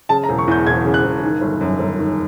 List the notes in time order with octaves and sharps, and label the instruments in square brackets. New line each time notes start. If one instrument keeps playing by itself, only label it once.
[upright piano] C#3 A5
A#5
E1
C#6
E2 G6
E1 G#6
C#3
F#6
E1
D#3
G1
F#2
G1
D#3